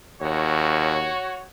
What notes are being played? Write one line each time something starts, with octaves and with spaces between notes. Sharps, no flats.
D#2 F#4 C#5